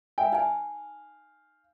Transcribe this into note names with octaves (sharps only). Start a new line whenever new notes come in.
E5 G5 G#5
D#4 F5 G#5